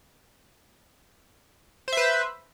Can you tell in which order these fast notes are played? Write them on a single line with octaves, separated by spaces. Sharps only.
C5 E5 B4